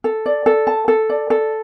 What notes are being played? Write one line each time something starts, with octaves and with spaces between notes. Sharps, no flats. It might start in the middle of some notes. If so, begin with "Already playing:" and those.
A4
D5
A4
A5
A4
D5
A4